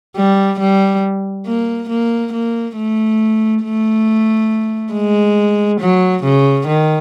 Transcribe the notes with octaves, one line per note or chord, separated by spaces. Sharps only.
G3
G3
A#3
A#3
A#3
A3
A3
G#3
F#3
C#3
D#3